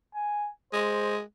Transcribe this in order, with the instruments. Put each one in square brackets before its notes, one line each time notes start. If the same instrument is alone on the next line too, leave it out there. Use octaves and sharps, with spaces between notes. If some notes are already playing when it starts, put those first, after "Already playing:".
[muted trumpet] G#5
[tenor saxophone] G#3 [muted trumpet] C5